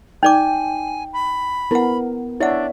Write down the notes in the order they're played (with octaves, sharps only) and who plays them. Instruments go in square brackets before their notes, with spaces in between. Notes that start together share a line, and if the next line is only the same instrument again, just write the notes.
[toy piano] D#4 D5 D6 [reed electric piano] G5 [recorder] G#5
[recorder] B5
[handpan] B3 A#4 [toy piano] E4 F#5
[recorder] D4 [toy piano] E4 F#5 [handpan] C#5 D5 E5